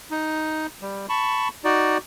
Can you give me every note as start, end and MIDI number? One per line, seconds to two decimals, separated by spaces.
0.11 0.67 63
0.82 1.06 55
1.09 1.48 81
1.09 1.48 83
1.09 1.48 85
1.64 1.98 63
1.64 1.98 66
1.64 1.98 74